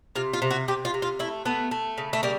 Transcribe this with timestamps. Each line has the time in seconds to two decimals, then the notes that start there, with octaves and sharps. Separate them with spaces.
0.15 C3 F4
0.33 F4
0.42 C3
0.51 F#4
0.68 C3 G4
0.85 F4
0.94 C3
1.02 F4
1.19 A3 E4
1.45 A3 B3
1.71 A3
1.98 C#3
2.13 A3
2.23 G3 A#3